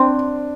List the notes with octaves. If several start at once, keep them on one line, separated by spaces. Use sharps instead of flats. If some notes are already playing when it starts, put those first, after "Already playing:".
Already playing: C4 D4